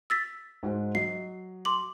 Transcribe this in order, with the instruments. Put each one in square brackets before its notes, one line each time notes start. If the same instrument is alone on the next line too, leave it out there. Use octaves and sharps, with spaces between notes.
[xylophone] E6 A6 B6
[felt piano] G#2 F#4 C5
[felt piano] F#3 D#5 [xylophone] C7
[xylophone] C6 D6 F#7